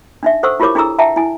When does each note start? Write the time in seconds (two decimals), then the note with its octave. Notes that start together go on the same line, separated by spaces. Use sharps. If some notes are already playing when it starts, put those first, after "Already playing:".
0.23 D4 D#4 E5
0.43 A4 C5 F#5 C#6 E6
0.60 E4 F4 G4 A#4 C#5 D6
0.75 D4 E4 G#4 A4 A#5 E6
0.99 E5 F#5 G5 A5 A#5
1.16 E4 G#5